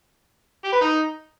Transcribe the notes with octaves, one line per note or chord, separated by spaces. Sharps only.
G4
B4
D#4